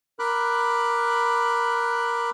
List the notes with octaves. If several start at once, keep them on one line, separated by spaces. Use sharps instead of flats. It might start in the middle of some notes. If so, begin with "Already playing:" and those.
A#4 B5 D6 F#6